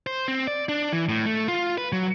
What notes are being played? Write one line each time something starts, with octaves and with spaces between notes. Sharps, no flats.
C5
C4
D5
D4
E3
A2
A3
F4
B4
F#3